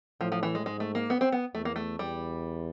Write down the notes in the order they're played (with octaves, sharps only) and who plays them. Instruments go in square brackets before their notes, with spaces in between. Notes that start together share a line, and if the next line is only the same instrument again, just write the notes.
[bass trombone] A2 [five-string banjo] F3
[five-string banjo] F3
E3
G#3
[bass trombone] G#2 [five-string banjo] G#3
[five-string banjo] A3
A#3
B3
C4
B3
[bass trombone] E2 [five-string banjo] A3
[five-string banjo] A#3
A3
[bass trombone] E2 [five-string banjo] G3